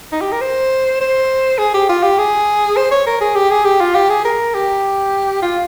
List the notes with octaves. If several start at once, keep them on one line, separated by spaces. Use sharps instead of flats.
D#4
G4
A#4
C5
C5
G#4
G4
F4
G4
G#4
C5
C#5
A#4
G#4
G4
G#4
G4
F4
G4
G#4
A#4
G4
F4